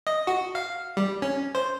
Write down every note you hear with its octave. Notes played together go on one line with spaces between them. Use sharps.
D#5
F#4
F5
G3
C#4
C5